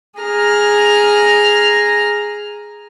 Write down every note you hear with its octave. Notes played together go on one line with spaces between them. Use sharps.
G#4 A#5 F6